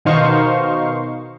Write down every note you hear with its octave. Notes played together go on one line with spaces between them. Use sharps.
B2 D#3 D#4 C5 F5 C#6